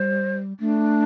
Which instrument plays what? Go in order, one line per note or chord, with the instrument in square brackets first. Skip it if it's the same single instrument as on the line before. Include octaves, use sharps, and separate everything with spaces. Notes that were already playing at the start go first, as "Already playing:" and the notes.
Already playing: [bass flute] G3 [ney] C5
[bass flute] A3 [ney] D4